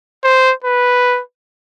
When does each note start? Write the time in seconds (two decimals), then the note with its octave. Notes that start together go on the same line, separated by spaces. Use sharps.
0.24 C5
0.64 B4